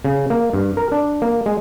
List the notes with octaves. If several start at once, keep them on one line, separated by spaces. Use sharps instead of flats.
C#3
A#3
G2
A#4
D4
A#3
G#3